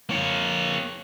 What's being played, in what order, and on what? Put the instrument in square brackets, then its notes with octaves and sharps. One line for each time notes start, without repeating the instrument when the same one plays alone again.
[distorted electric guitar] A#3 C#5